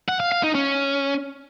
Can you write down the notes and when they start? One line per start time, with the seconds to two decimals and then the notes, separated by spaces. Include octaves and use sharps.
0.09 F#5
0.20 F5
0.32 F5
0.43 D#4
0.55 C#4